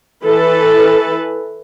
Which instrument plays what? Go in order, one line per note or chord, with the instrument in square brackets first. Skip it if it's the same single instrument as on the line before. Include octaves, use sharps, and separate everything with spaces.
[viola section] E3 A4 B4